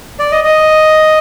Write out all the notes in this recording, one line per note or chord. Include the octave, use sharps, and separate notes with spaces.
D5
D#5
D#5